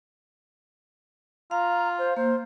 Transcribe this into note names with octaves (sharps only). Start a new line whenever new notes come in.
F4 F5 A#5
C5
A#3 C5